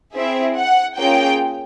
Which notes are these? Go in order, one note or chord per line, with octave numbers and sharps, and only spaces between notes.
C4 E4 G#4 E5
F#5
A#3 C#4 F4 G#4 G5